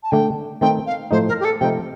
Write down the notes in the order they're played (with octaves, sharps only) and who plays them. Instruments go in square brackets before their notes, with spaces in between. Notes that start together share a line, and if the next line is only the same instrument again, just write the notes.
[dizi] A5
[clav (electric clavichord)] D3 A3 D4 [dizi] G5
[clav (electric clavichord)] D#3 A3 C4 D#4 [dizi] G5
[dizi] F5
[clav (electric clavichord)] A2 F3 A3 D#4 [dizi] C5
[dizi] A#4
G4
A4
[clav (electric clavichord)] C3 F3 A3 D#4 [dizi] G5